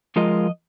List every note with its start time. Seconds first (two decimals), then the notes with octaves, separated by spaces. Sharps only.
0.16 F3 G#3 F4 A#4 D#5